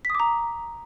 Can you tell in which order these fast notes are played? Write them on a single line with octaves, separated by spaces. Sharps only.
B6 D#6 D6 A#5